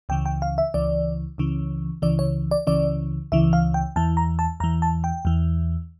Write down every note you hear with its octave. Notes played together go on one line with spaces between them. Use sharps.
C#2 C#3 E3 G5
G5
F5
E5
C#2 C#3 E3 D5
C#2 C#3 E3
C#2 C#3 E3 D5
C#5
D5
C#2 C#3 E3 D5
C#2 C#3 E3 E5
F5
G5
E2 E3 A5
A#5
A5
E2 E3 A#5
A5
G5
E2 E3